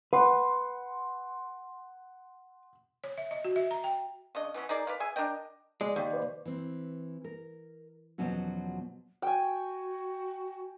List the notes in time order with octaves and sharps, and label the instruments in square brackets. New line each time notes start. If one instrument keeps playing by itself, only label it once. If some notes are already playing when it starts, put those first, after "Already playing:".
[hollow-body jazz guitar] B4 [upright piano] F#5 C6
[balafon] C#5
E5
D#5
F#4
E5
A#5
G5
[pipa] C#3 D4 D#5
E3 B3 C#4
D#4 G#4 A#4 D5
B4 D5 F5
G#4 E5 G#5
D4 A#4 D#5 G5
[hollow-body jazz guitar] G#3 [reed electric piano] D5
[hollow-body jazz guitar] D#2
[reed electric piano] B4 C5 D5
[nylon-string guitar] E3 C4
A#4
E2 B2 F3 F#3 C#4 F#4
[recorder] F#4 [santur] G5 G#5